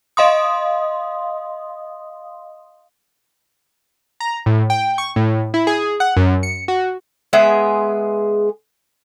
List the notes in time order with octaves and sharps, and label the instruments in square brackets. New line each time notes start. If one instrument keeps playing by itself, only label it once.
[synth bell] D#5 F5 C6 D#6
[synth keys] A#5
A2
G5
C#6
A2
E4
G#4
F#5
F#2
C#7
F#4
[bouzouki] G#3 B3 G#4 E5